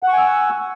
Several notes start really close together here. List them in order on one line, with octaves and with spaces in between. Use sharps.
F#5 C#6 G#5 E6